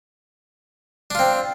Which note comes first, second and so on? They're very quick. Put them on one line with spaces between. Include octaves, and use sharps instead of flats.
D4 F4 C4